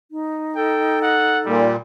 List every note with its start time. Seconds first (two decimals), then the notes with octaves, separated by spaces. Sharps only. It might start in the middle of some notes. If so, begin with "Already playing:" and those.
0.11 D#4
0.56 A4 G5
1.02 F#5
1.46 A#2 G3